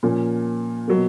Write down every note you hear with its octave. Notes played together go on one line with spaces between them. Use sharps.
A#2 F3 A#3 C#4
B2 F#3 A#3